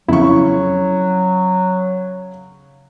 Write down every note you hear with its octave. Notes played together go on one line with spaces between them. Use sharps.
F2 C#3 F#3 E4 C#6